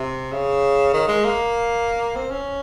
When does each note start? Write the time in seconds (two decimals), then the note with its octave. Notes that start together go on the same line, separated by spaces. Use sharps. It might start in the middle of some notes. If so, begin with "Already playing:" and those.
Already playing: C3
0.32 C#3
0.93 D#3
1.08 G#3
1.25 A#3
2.16 C4
2.31 C#4